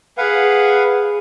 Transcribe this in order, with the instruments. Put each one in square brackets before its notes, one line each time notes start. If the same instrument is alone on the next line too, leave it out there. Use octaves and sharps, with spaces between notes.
[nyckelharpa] G#4 [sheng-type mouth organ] B4 F5 F#5